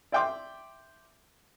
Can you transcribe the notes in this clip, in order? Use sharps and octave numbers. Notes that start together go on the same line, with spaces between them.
D5 E5 G5 C6 D6